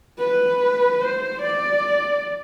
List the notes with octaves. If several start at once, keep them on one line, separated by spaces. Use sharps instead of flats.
B4
C5
D5